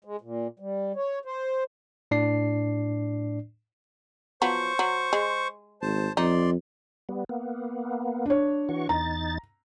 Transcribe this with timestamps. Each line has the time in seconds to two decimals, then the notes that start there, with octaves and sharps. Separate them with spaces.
0.05 G#3
0.21 A#2
0.59 G3
0.96 C#5
1.25 C5
2.11 A2 D4 D5 C7
4.42 F3 F#3 B3 C5 C#6
4.79 F#3
5.13 G#3
5.82 G#1 C5 A5
6.17 F2 D#4 D5 C6
7.09 G3 B3
7.29 A#3 B3
8.26 D4 C#5
8.69 E3 F#4 C#6
8.89 E2 D#4 A#5 A6